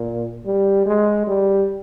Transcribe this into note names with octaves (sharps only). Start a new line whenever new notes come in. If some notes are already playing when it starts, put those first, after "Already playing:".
Already playing: A#2
G3
G#3
G3